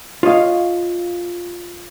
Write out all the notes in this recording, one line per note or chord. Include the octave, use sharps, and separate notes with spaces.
F4 C#5 D#5 F5